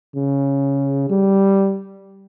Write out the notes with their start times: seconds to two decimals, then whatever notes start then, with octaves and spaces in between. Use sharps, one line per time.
0.16 C#3
1.09 G3